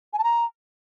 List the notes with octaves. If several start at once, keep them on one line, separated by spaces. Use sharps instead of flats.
G#5
A5
A#5